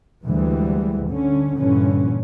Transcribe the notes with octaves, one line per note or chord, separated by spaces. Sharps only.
D2 E3 G3 G#3
D3 C#4
G2 A#2 D3 E3 C#4